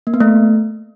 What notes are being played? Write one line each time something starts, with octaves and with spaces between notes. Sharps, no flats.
A#3
B3
A3